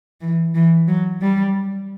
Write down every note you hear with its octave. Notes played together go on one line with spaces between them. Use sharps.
E3
E3
F#3
G3